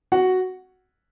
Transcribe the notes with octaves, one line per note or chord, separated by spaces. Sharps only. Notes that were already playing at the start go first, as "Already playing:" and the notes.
F#4 F#5